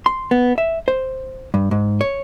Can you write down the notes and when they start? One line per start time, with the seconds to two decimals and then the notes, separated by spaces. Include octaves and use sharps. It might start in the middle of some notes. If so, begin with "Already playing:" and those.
0.06 C6
0.31 B3
0.58 E5
0.88 C5
1.54 G2
1.71 G#2
2.01 C#5